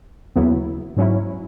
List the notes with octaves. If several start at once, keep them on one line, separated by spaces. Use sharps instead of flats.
D#2 C#3 F#3 B3 E4
G#2 F#3 C#4 E4